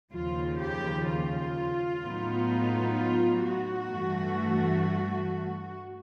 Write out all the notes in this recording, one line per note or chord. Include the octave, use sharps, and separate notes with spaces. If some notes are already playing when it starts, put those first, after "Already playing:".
D#2 C#3 F3 F4
G4
F4
A2 F#3 B3 D#4
F4
F#4
G2 E3 A3